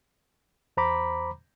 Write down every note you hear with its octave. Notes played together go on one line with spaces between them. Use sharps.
E2 C5 A#5 B5 D6